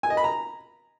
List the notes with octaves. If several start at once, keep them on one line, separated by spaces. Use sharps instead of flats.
G#5
D#5
B5
A#5